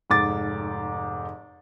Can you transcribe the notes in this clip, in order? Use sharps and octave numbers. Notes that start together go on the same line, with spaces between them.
F1 G#2 D6 A6